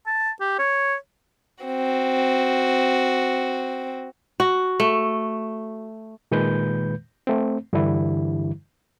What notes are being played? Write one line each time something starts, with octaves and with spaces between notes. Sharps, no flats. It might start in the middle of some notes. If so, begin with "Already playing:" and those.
A5
G4
C#5
C4 F#4
F#4
A3
A#2 D#3 G#3 B4 G6
A3 C4
G2 D3 E3 G3 E4